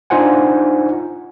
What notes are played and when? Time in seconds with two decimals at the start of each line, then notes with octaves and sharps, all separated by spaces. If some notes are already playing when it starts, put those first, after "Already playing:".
0.10 D4 D#4 F4 C5 F#5 G#5